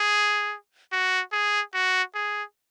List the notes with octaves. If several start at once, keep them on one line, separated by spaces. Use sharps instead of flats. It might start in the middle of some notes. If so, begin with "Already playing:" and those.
Already playing: G#4
F#4
G#4
F#4
G#4